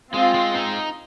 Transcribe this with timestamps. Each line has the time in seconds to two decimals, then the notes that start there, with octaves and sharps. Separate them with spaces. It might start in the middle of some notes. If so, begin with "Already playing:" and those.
0.13 G#3 C4 F4
0.34 G#3
0.55 D#4